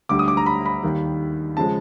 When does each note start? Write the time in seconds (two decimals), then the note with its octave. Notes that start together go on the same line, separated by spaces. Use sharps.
0.09 D2 D3 G3 D6
0.19 D#6
0.28 D6
0.37 A#5
0.46 B5
0.66 B5
0.83 D#2 D#3 G3
1.57 C#3 F3 G#3 A5